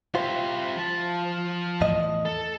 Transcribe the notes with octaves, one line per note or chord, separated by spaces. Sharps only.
E4 F4 G4 C5
F3 A5
E2 A2 D#5
A4